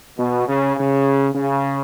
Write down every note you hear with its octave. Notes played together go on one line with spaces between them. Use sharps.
B2
C#3
C#3
C#3